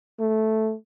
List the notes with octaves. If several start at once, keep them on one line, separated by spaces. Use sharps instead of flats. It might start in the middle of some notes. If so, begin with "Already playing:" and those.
A3